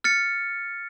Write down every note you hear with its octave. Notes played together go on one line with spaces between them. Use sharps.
F6 A6 C#7